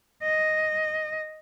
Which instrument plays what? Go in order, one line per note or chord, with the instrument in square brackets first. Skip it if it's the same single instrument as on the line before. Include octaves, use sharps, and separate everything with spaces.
[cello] D#5